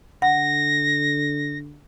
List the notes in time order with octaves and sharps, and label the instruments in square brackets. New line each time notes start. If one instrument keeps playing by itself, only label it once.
[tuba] D3 [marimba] F#5 [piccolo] A#6